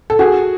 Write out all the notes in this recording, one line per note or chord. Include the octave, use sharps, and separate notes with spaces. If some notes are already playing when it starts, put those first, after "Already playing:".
A4
F#4 G#4